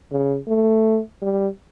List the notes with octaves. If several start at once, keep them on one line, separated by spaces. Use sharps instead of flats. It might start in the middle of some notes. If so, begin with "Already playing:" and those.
C#3
A3
G3